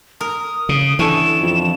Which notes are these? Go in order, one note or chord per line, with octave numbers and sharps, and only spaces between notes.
A#4 D#6
C#3
D3 E3 C#4 A4 E7
F2